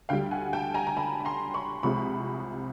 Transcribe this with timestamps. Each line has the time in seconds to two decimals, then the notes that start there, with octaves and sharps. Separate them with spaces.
0.09 D2 D3 G3 F5 G5
0.31 F#5 G#5
0.53 G5 A5
0.74 G#5 A#5
0.87 A#5
0.97 A5 B5
1.20 B5
1.25 A#5 C6
1.54 B5 C#6
1.83 C2 C3 F3 G#3 B5 C#6